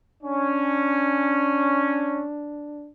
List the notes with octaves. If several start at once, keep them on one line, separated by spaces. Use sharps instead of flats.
C#4 D4